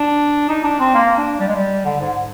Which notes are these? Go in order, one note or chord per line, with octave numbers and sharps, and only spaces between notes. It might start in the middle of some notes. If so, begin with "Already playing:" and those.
Already playing: D4
D#4
D4
C4
A#3
D4
G3
G#3
G3
D3
G#2